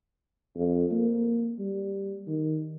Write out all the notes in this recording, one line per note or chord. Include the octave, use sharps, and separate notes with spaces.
F2
A#3
G3
D#3